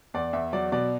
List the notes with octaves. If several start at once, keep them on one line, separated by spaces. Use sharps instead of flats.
E2 D5
E2 E5
F#3 D5
B2 D5